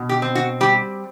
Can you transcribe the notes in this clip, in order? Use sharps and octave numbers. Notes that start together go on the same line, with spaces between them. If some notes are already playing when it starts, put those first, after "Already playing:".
Already playing: B2
G4
C4
F#4
G3 G4